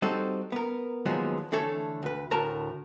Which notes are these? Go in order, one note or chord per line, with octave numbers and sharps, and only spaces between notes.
G3 C4 D#4 F#4 A4
B3 A#4
D#2 F3 F#3 G#3 B3 D#4
D3 E3 A3 A4 C#5
D2 B4
D2 A2 A#4 A5 A#5